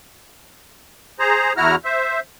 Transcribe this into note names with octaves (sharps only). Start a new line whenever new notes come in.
G#4 C5 A#5
E2 E4 F#4 A#5 F6
C5 E5